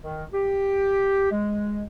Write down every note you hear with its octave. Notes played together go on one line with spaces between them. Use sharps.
D#3
G4
G#3